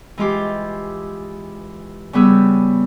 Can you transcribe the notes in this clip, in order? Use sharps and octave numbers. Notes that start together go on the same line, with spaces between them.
E3 G#3 F4 G4
C#3 G3 B3 G#4 E6